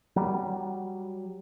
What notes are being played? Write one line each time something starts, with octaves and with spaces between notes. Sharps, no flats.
F#3 G3